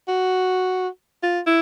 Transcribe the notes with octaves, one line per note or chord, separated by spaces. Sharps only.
F#4
F4
E4